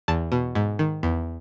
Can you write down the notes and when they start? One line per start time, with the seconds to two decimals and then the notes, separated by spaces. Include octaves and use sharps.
0.08 E2 A5
0.32 B2
0.55 G#2
0.79 D#3
1.03 E2